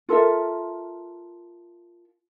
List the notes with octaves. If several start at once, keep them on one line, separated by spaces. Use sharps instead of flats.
F4 A4 A#4 E5